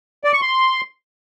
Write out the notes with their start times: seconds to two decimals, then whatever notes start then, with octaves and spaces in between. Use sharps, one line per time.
0.24 D5
0.33 C#6
0.41 C6